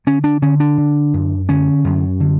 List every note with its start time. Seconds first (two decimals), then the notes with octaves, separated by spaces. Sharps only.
0.07 D3 C#4
0.24 D4
0.42 D3 C#4
0.60 D4
0.78 D3
1.13 F#2
1.49 D3 C#4
1.84 F#2
2.20 D3